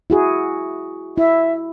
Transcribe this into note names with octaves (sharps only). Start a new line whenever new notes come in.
E4 F#4 G#4
E4 E5